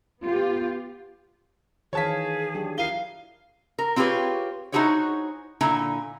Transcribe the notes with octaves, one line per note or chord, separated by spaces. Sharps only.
B3 F4 G4
D#3 E3 G#4 C#5 F5 A5 B6
F#3 D4 G4
E4 F4 A#4 F5 C7 D#7 G7
A#4
C4 F4 G4 G#4 B4 C#5
D#4 E4 F#4 G#4 C5 C#5
A#2 D3 E4 G#5 A#5